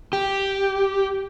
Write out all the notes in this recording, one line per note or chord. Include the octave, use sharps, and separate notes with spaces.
G4